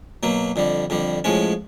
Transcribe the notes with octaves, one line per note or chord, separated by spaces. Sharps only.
B2 F#3 A#3
F2 D3 G3
F2 D3 G3
A2 F3 G#3 C#4